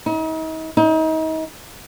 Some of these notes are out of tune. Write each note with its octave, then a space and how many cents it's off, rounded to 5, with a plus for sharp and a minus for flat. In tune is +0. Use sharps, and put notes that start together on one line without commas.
D#4 +40
D#4 +35